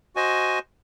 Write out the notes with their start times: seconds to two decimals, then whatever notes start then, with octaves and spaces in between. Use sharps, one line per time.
0.16 F#4 C5 D#5 G#5